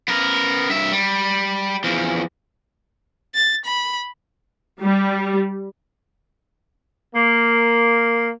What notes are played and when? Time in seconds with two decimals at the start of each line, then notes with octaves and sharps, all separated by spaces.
0.08 B3 A#4
0.70 G2 E5
0.92 G3
1.84 E2 F3
3.35 A6
3.66 B5
4.81 G3
7.15 A#3